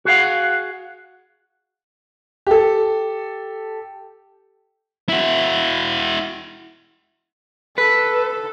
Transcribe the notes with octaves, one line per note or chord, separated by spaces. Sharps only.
F#4 G#4 F5 F#5
G4 A4
E4 F#4
A4 B4